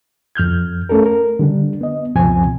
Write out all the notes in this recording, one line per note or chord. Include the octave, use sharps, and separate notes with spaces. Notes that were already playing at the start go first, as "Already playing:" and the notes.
F2 F6 G6 G#6
A3 C#4 A4 A#4
A#4
D3 G3 D4
B3 D#5
C#2 F#2 B2 F3 C4 G#5